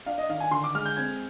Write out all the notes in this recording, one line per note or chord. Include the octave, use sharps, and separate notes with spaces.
D4 F5
D#5
D#3 F5
G#5
D3 C6
D6
G#3 F6
G6
C4 G#6